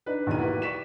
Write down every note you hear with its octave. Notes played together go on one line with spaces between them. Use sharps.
D4 D#4 B4
B1 E2 D#3 E3 A#5 D#7
A#3 E4 F#4 G4 B4
D5 C#6 B6 E7